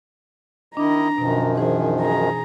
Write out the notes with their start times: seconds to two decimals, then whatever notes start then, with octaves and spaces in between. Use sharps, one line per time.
0.77 D#3 D4 E4 D#5 A#5
1.18 F#2 B2 D#3 F3
1.57 E3 D#4 G#4 C5
2.01 G#4 A#5